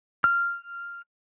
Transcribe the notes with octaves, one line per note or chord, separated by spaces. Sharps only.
F6